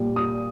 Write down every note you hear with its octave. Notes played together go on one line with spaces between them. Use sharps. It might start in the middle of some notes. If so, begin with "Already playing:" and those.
Already playing: A#2 G3
D#6